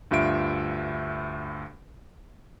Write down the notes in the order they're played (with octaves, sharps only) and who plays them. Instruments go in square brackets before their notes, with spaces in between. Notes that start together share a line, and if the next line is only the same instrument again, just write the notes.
[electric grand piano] D2 G2 F4 E5 D7